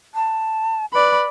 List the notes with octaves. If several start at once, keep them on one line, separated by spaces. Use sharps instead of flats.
A5
B4 D5 B5